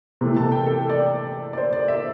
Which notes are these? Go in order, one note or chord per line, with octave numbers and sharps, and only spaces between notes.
C3 E3 A3
A5
G5
A4
D5
D5
C5
D5
E5